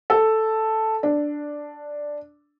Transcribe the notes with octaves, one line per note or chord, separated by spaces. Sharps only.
A4
D4